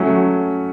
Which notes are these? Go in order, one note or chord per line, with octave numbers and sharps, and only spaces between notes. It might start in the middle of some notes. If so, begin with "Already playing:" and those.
Already playing: F#3 A3 C#4 F#4